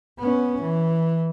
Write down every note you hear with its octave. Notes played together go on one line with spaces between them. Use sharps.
B3 C#4
E3